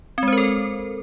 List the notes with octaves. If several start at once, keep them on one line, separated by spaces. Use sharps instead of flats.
G#3 C4 A4 A#4 C5